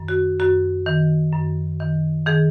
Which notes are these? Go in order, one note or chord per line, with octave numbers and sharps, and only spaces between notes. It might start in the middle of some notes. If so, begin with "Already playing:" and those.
Already playing: F#2 D#3
F#4
F#2 F#4
D#3
F#2
D#3
D#3 G#4